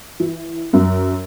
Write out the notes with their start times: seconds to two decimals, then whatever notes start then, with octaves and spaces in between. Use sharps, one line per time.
0.20 E3
0.73 F#2